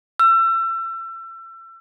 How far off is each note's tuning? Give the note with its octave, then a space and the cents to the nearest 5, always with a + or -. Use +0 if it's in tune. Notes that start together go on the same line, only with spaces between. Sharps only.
E6 +35